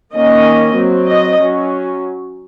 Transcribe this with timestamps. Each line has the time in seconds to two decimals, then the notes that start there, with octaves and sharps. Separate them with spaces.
0.13 D#3 A#3 C#4 D#5
0.76 F#3 C4
1.07 D#5
1.39 F#3 C#4